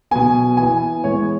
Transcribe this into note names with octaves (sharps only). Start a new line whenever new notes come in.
B2 F#3 B3 G#5
E3 B3 G#5
E3 G#3 B3 C#5